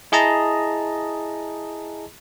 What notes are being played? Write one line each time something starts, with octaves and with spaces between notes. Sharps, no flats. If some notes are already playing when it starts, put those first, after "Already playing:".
E4 G#4 D#5 A5 A#5